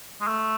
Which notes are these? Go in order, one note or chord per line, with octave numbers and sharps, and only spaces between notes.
G#3
A3